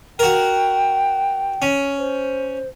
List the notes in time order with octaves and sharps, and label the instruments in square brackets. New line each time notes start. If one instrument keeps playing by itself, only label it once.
[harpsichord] F#4 A#4 [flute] G5
[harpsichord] C#4
[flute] C5